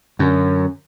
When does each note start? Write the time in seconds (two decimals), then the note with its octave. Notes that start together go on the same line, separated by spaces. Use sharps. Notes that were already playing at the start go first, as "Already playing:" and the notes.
0.19 F#2 D3 C#4